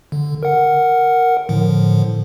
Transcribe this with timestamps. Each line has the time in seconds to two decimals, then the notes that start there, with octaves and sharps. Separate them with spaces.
0.12 D3
0.43 A#4 F#5
1.49 A2 D3 F3